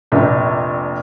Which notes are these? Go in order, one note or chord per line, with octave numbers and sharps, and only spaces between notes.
F1 A#1 A#2